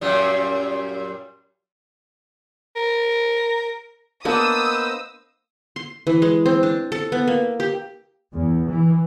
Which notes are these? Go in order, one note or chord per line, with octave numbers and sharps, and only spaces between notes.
F#2 A#2 G3
A#4
A#3 B3 D4 B4 C5 D#5 D#6 E6
C6
E3
G#3
C4
D4
A4
B3
A#3
G4
E2
E3